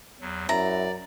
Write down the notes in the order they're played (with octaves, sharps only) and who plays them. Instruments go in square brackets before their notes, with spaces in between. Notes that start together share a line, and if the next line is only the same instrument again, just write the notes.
[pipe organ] E2 F#3
[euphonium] F#2 [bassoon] E4 [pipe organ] D5 [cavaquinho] A#5